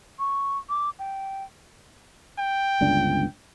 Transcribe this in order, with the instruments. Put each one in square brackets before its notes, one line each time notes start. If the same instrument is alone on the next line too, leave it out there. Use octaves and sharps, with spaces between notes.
[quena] C#6
D6
G5
[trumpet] G5
[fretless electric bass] G1 C#2 D4